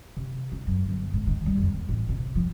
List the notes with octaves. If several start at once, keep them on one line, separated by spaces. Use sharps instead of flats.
C3
D#4
F#2
G1
G#2
D#3
G3
F2
D#2
A1
C3
F3